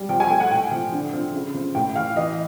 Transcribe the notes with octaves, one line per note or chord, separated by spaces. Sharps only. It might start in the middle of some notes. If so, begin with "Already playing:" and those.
Already playing: G3
F3 G5
G#5
A3 G5
F#5
A2 G5
F3
D3
F3
C#3
F3
A2 G5
E3 F5
E3 D#5